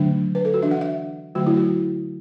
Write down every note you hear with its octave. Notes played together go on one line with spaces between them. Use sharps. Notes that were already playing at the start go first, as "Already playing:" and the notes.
Already playing: D3 F#3 A3 D4
B4
A4
F#4
E3 D4 E5
F#5
E5
D3 F#3 A3 F#4
E4
F#4